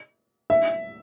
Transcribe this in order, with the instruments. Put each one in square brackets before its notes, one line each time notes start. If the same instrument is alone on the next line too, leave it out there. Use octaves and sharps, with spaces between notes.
[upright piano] E5